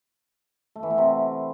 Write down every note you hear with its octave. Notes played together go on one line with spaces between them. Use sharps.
A3
E3
B3
C3